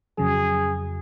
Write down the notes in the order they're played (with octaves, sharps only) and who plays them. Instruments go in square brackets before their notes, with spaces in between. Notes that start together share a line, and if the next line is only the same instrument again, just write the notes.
[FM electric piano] F2 C#3 F#3 [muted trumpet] G#4